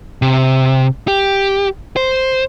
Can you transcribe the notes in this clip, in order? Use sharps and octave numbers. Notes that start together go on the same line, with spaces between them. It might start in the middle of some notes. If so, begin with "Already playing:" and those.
C3
G4
C5